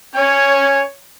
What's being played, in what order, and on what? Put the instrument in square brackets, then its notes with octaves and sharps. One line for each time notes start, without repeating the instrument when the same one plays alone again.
[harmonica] C#4 G#5 [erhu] C#5